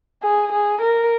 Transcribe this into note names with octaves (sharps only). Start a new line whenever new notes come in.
G#4
G#4
A#4